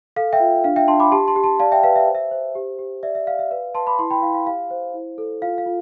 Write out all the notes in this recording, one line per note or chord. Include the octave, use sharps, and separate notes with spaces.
A4 F5
E5 G5
F4
D4 F5
E5 G5
D4 A5 C6
B5 D6
G4 A5 C6
A5 C6
G4
A5 C6
D5 F5 A5
E5 G5
B4 F5
E5
C5
E5
C5
G4
G4
D5 E5
E5
D5 F5
E5
B4 F5
B4 A5 C6
B5 D6
E4 A5 C6
G5 B5
E4 F5
F5
G4 F5
C5
E4
A4
F4 F5
F5
F4